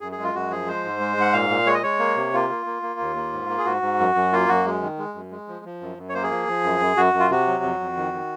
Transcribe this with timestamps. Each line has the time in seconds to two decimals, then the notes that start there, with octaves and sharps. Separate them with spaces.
0.01 F#2 G#4
0.12 G#4
0.18 G#3
0.23 F4
0.34 F#2 F#4
0.50 F3 G#4
0.67 G#3 C5
0.84 G#2
1.00 G#3
1.17 G#2 F#5
1.33 A#2 F5
1.50 A#2
1.66 G#3 C#5
1.75 D#5
1.83 G#3 C#5
1.99 A#3
2.16 C3
2.33 A#3 F4
2.50 A#3
2.66 A#3
2.82 A#3
3.00 D#2
3.16 A#3
3.33 G#2
3.49 A#3
3.58 G#4
3.65 G#2 F#4
3.82 G#2
3.99 F#2
4.15 F#2
4.32 A#3 F4
4.48 F#2 F#4
4.65 G#3
4.82 D#3
4.98 G#3
5.14 F#2
5.31 G#3
5.48 F3
5.65 F3
5.81 F#2
5.97 F#2
6.09 C#5
6.14 A#3 C5
6.23 G#4
6.31 F3
6.48 F3
6.64 F#2
6.80 F#2
6.97 F#2 F#4
7.14 F#2
7.20 F4
7.31 C3 F#4
7.47 F#3
7.63 F2
7.80 F2
7.97 D#3
8.13 D#3